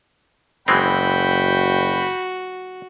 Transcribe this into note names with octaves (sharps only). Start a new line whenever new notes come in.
F#1 E3 G#3 C4 F#4 G5 B5